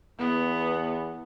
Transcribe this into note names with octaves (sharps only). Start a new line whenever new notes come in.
E2 B3